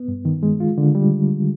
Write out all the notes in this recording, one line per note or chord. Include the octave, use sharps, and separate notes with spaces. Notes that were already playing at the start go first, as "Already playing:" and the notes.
Already playing: B3
G2
D#3
G#3
F4
D3
G3